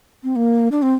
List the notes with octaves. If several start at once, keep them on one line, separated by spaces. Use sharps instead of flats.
C4
A#3
D4
C4